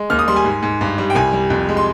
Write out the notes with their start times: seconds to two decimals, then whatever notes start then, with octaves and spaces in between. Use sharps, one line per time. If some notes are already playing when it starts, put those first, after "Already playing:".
Already playing: G#3
0.10 D#2 F6
0.19 D#6
0.28 G3 C6
0.36 G#5
0.45 G#2
0.62 G#2
0.81 G2
0.98 G3
1.10 G5
1.15 C2 G#5
1.33 G3
1.50 F2
1.69 G#3
1.77 C6